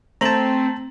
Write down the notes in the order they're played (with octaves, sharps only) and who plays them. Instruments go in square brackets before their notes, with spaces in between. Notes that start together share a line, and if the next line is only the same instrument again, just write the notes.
[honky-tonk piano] A3 F#7 [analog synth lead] C4 [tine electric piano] A5 A#5